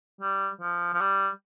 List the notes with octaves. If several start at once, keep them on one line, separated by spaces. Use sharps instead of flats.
G3
F3
F3
G3